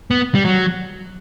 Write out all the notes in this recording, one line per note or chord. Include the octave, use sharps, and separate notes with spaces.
B3
G3
F#3